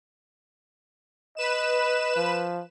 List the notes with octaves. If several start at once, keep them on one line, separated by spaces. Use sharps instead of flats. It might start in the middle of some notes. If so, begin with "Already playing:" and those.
B4 D#5 E7
F3